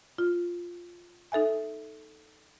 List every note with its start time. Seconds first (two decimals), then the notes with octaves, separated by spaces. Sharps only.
0.18 F4
1.32 D#4 A4 E5 G#5